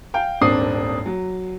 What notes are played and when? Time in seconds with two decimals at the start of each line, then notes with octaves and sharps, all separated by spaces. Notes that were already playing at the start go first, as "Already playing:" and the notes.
0.14 F5 G5
0.41 D#1 G#1 C4 D4 D#6 C7
1.06 F#3